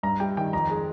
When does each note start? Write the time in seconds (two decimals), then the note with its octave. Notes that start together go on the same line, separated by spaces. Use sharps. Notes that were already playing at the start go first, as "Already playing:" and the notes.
0.03 G2 A#5
0.20 G3 G5
0.37 D#3 G5
0.53 F2 A#5
0.70 G#3